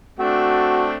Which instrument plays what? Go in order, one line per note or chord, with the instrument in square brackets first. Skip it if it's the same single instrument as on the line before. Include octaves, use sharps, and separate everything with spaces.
[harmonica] A3 C4 D4 [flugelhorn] F#4